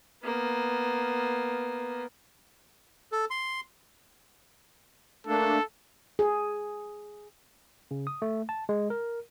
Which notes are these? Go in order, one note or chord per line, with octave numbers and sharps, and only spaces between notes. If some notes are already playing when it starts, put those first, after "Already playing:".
A#3 B3
A4
C6
A3 A#3 D4 A4
G#4
C#3
D#6
A3
A5
G#3
A#4